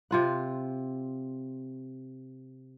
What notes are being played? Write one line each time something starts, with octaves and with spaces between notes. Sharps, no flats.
C3 F4 F#5